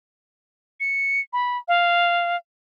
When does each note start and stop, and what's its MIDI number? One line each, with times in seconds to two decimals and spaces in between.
0.80 1.20 97
1.33 1.58 83
1.68 2.36 77